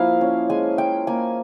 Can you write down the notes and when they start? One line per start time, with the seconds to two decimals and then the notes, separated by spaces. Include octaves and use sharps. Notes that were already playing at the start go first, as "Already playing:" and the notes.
Already playing: F3 A#3 E4 F5
0.21 C#4
0.50 G#3 G#5
0.78 G#3 G5
1.07 A#3 G#5